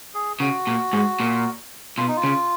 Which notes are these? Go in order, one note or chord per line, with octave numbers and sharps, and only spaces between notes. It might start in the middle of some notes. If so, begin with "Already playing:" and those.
G#4
C#3 F#4
A#2
G#2
A#2
B2 F4
D#4
F4
C#3